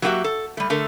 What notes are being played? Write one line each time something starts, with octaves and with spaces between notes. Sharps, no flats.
F#3 A#3 D#4 F#4 G4 E5
A4
G3 A3
D3 A3 A4 A#4 E5